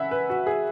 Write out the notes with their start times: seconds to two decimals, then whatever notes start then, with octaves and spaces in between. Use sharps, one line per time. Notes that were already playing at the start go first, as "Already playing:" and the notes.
Already playing: C#3 E3 E5 F#5 G#5 B5
0.11 B4
0.30 F#4
0.47 G#4